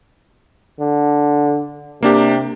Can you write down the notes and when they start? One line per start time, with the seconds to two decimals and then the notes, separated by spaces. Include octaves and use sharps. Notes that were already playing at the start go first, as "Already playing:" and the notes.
0.80 D3
2.03 C3 A#3 D4 G4